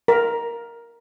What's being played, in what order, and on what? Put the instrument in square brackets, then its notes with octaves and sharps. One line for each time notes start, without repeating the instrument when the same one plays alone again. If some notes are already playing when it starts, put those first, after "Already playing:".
[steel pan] A#4